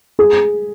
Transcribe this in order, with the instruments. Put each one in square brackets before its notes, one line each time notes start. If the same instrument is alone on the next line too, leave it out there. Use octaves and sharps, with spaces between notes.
[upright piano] G#4